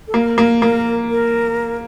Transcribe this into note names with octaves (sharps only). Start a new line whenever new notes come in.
A4
A#3 A#4
A#3
A#3 A#4
A#4